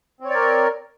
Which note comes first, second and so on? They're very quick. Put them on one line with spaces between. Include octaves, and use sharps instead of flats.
C4 C#5 D5 A#4